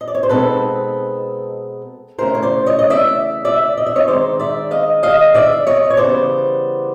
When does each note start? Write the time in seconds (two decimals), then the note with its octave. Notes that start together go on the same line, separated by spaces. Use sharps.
0.01 D#5
0.08 D5
0.15 C#5
0.23 C5
0.29 B2 G#3 C4 D#4 A4 B4
2.18 C#3 E3 A3 C#4 A#4 C5
2.35 C#5
2.42 C5 D5
2.66 C#5 D#5
2.79 D#5
2.90 D5 E5
3.45 D5 E5
3.77 D#5
3.86 E5
3.96 C#5 D#5
4.08 D#3 G#3 C4 C5 D5
4.40 D5 E5
4.71 D#5 F5
5.03 D#5 F5
5.34 D5 E5
5.67 C#5 D#5
5.90 C#5
5.97 C#3 E3 G3 B3 C5 D5